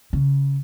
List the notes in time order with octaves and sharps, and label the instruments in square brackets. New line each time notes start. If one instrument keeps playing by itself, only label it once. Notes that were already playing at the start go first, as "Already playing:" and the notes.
[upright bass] C#3